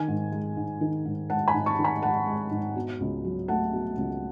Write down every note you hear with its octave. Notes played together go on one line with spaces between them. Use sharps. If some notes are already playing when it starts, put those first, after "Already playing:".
Already playing: D#3 G#5
G#2
G#3
G#2
D#3
G#2
G#3 F#5 A5
G#5 B5
G#2
A5 C#6
D#3
G#5 B5
G#2 F#5 A5
G#3
G#2
B2
C#2
F#3
A3 F#5 A5
B2
C#2